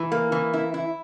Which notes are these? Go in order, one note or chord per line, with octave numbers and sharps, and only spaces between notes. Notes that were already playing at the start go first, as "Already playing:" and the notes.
Already playing: E3
A#3
E3
E4
E4